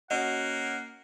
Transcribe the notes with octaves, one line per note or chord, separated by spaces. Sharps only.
A#3 C#4 F#4 D#5 F#5